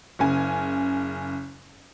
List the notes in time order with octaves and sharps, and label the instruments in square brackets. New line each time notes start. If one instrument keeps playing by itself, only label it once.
[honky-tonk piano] F#1 C#3 G#5